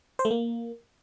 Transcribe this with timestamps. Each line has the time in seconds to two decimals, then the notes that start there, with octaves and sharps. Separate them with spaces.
0.19 C5
0.25 A3
0.31 A#3